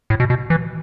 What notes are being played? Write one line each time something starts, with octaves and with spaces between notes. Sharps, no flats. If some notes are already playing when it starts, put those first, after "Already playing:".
A2
B2
B2
E3